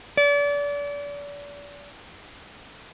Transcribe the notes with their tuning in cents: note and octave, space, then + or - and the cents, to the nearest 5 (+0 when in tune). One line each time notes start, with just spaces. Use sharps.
D5 -35